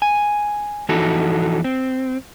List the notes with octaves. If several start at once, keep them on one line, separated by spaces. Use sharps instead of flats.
G#5
F2 E3 D#4 F#4 A4
C4